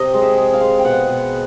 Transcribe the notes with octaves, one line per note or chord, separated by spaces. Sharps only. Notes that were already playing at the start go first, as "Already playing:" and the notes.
Already playing: C3 D#5
G#3
E5
G#3
F5
G#3
G5
B2 F#5
B2